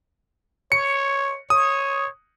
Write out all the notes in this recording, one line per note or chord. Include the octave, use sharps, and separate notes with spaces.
C#5 C#7
C#5 D#6